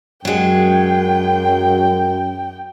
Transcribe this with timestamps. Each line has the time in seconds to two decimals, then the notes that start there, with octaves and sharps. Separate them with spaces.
0.25 F#2 F#3 G#3 G5